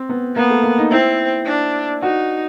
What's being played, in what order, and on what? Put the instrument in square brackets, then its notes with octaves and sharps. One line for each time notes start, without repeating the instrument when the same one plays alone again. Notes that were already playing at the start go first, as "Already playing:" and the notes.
Already playing: [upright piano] C4
B3
[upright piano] A#3 [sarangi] B3
[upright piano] A3
A#3
D#4
[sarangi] C4 [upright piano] E4
[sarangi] D4
[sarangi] D#4 [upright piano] F#4